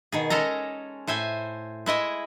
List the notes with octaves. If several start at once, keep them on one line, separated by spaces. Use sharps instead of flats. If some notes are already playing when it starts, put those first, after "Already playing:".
B2 D#3 G#4
G#3 C#4 A4 D#5 A#5
A2 C5 E5 G#5
G#3 E4 D#5 E5